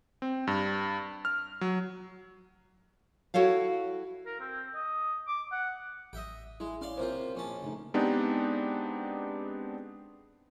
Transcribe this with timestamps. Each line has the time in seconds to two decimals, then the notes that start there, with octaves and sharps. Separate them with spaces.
0.22 C4
0.47 G2
1.25 F6
1.61 F#3
3.34 E4 F#4 A4 C#5 F5
4.25 A#4
4.40 C4
4.75 D#5
5.27 D6
5.52 F#5
6.13 A1 D#5 E5 G5
6.60 G#3 E4
6.81 C#4 D5 F5 C6
6.98 C3 A#3 F4 C5
7.35 A#1 C#4 A5
7.62 C#3 A3 D#4
7.94 G#3 B3 C4 D4 D#4 G4